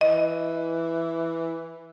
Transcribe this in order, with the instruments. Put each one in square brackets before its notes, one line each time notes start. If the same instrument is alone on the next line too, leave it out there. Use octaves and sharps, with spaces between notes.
[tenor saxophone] E3 [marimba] D#5